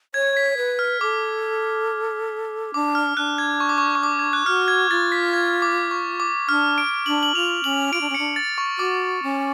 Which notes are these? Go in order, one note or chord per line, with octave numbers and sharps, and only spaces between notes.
C#5 G#6
B6
B4
F6
A4 D6
D4 D6
F6
D4 F#6
G#6
C#6
D6
C#6
C#6
D6
G#6
F#6
F#4 F6
G#6
F4 A6
B6
G#6
D6
C#6
D6
D4 F6
D7
D4 F#7
F#7
F4 F7
C#4 F#7
F4 D7
D4
C#4
D4 C#7
A6
C#6
F#4 D6
C#4